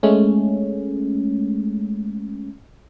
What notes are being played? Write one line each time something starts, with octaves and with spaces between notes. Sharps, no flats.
G#3 A3 C#4